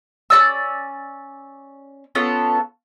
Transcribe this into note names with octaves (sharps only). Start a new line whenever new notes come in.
C#4 F#4 D5 E6
B3 C#4 F4 A4